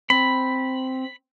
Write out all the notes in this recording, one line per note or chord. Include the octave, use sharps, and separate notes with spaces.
C4 B5